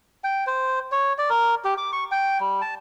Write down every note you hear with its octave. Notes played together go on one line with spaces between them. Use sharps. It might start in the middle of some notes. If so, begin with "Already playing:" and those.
G5
C5
C#5
D5
A#4
G4
D6
C#6
G5
G3
A5